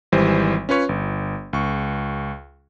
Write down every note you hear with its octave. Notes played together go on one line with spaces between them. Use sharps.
G#1 E3 G3 C5
C#4 F4 B4 C#5 C#6
G1
C#2 C#6